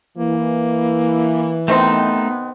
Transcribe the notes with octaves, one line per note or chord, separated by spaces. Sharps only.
E3 A#3
C3 D#3 A3 B3 C4 D#4